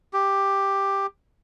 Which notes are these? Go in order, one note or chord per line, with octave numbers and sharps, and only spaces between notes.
G4